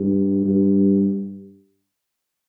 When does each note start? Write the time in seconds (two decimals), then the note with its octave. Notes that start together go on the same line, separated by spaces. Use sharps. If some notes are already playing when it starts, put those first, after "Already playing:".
Already playing: G2
0.45 G2